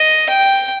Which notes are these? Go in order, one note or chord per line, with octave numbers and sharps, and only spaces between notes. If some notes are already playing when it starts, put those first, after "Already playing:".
Already playing: D#5
G5